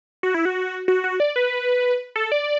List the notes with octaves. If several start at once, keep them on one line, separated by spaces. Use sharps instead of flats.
F#4
E4
F#4
F#4
F#4
D5
B4
A4
D5